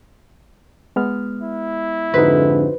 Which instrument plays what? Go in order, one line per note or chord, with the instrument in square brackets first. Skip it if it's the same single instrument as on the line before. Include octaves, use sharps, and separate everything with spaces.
[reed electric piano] G#3 B3 F6
[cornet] E4
[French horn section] F2 G#2 D3 [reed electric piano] D#4 F#4 C5 [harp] B4